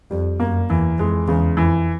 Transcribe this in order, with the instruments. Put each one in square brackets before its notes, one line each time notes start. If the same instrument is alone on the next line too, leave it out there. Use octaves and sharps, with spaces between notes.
[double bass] F2 [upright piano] G3
[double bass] F#2 [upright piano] A#3
[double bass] E2 [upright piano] E3
[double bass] F2 [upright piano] G#3
[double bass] E2 [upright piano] C#3
[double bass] F2 [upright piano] E3